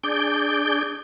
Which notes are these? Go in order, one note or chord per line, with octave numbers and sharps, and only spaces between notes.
D4 G#4 D5 G6